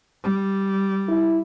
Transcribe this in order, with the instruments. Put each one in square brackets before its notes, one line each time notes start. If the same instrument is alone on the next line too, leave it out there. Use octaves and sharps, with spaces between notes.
[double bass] G3
[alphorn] E4